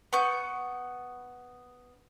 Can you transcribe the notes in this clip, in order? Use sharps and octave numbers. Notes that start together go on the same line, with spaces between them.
B3 C#6 G6